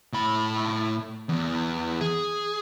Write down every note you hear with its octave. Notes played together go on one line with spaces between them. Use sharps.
A2 B5
E2
G#4